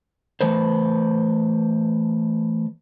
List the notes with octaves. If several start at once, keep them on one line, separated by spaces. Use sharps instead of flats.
E3 A3 B4 C5